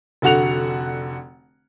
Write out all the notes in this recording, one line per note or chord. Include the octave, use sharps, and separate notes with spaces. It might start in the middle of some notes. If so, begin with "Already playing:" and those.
F1 D3 F#4 F#5 F7